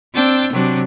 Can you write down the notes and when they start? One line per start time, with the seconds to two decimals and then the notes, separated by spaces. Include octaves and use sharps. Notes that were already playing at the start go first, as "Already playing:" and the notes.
0.14 C4 D4 G5 E6 A6
0.52 C3 F#3 D4